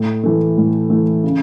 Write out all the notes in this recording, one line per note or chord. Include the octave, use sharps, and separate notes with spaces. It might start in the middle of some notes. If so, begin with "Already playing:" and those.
Already playing: A2
E3 A3
A2
E3 A3
C#3